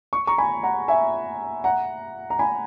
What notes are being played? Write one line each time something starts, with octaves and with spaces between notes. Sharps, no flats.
C#6
A#5 C#6
G#5 B5
F#5 A#5
E5 G#5
F#5 A#5
A#5
G#5 B5